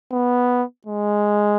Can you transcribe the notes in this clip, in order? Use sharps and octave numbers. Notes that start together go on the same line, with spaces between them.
B3
G#3